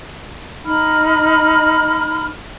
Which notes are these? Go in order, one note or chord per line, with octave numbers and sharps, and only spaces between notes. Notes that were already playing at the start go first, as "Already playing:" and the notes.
D#4 B5 F6